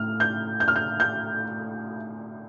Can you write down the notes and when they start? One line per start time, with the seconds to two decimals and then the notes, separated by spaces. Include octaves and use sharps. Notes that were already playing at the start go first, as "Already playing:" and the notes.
Already playing: A2 F6
0.20 G6
0.60 G6
0.68 F6
0.76 G6
1.00 G6